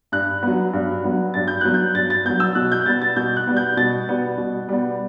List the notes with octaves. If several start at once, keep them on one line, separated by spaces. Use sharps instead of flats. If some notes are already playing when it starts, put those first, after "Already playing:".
G2 F#6
F#3 B3
G2
F#3 B3
G2 A6
G6
F#3 B3 F#6
G6
G2 A6
A6
F#3 B3 G6
E6
B2 F#6
G6
G3 B3 A6
A6
B2 G6
F#6
G3 B3
G6
B2 A6
G3 B3
B2
G3 B3